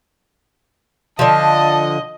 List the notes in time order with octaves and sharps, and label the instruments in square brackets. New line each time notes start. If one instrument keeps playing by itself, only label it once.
[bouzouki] D3 F3 [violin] D#5 [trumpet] A5